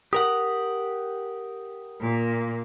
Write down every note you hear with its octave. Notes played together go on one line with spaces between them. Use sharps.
G4 A#4 F#5 D#6
A#2 A#3